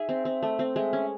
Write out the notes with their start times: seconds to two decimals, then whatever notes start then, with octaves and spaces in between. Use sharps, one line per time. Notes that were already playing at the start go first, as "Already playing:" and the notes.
Already playing: D#4 G#4 E5
0.09 C4
0.25 C4
0.42 A3
0.59 C4
0.76 G#3 E5
0.93 C#4